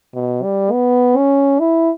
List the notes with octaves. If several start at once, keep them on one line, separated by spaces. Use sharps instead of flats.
B2
G3
B3
C#4
E4